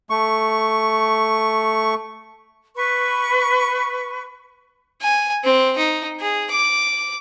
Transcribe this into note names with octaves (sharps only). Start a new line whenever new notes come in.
A3 C#6
B4 C#6
G#5
C4
D#4
G#4
D6